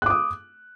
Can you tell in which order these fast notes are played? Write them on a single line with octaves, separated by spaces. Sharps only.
F#6 D6 D#6